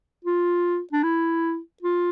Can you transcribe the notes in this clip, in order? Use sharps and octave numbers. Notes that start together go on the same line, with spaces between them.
F4
D4
E4
F4